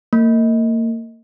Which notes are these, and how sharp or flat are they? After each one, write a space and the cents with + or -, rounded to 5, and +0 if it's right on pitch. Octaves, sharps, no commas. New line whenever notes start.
A#3 -35